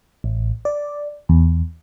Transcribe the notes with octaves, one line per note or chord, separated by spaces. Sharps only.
A1
D5
E2